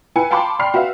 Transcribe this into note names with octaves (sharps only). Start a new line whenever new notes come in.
E4 B4 G#5 C#7
F5 G5 A5 B5 C6 D6
D5 G5 B5 C6 F6 C7
F#4 B4 E5 F5